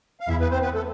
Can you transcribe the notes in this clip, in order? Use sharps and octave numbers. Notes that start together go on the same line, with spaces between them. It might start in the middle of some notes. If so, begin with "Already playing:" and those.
F5
E2 E4 E5
B3 B4
C4 C5
B3 B4
A3 A4